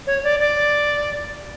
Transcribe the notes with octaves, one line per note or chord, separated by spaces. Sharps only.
C#5
D5
D5